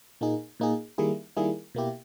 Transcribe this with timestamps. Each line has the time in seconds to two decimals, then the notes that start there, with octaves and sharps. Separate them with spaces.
0.21 A#2 A#3 D#4 G#4
0.60 A#2 A#3 D#4 G#4
0.98 D#3 G3 A#3 E4 G#4
1.37 D#3 G3 A#3 E4 G#4
1.75 B2 A#3 E4 G4